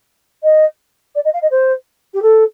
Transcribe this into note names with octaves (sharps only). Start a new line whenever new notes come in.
D#5
D5
D#5
F5
D#5
C5
G4
A4